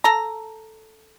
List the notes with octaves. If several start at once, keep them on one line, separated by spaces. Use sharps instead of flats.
A4 A#5